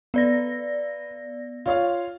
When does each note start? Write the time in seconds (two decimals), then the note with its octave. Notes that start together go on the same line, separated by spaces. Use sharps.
0.14 B3 B4 D5 A#6
1.66 F4 C#5 F5